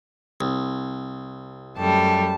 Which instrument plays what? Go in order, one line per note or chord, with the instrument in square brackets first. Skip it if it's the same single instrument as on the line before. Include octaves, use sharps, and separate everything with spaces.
[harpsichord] C2
[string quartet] F#2 G3 A3 [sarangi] A5